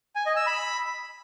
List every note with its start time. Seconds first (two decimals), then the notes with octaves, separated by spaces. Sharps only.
0.16 G#5
0.26 D#5
0.36 E6
0.47 B5